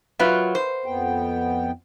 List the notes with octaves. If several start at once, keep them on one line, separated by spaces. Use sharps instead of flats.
F#3 F4 A#4 B4 E5
C5
F2 B3 G5